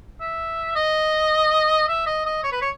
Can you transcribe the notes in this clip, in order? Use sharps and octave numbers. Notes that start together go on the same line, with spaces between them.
E5
D#5
E5
D#5
D#5
C#5
B4
C#5